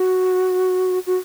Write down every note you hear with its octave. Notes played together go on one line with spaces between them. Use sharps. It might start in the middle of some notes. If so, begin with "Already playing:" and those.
Already playing: F#4
F#4